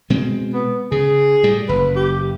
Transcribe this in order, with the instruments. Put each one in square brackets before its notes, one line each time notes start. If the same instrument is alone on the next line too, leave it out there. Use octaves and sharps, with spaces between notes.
[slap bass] B2 G#3 C4
[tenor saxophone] B3
[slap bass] C#3 [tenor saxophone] G#4
[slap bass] A2 G3
[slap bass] F#1 [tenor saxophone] B4
[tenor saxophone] G4